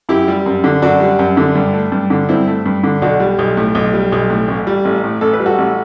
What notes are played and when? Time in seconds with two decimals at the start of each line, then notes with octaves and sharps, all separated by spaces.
0.09 F#2 E4 G4
0.28 G3
0.46 F#2
0.64 D3
0.82 F#2 D4 F#4
1.00 G3
1.19 F#2
1.37 D3
1.55 G2
1.73 A3
1.92 G2
2.10 D3
2.29 G2 C4 E4
2.47 A3
2.66 G2
2.84 D3
3.02 B1 D4 F#4
3.20 G3
3.39 B1
3.57 A2
3.75 B1
3.93 G3
4.12 B1
4.30 A2
4.48 A1
4.67 G3
4.85 A1
5.04 A2
5.21 A1 A4
5.33 B4
5.40 G3
5.46 F#4 A4
5.58 A1